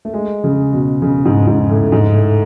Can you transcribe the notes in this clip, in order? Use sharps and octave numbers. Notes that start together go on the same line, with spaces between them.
A3
G#3
C#3
B2
C#3
G#2
G#2
A2
G#2
A2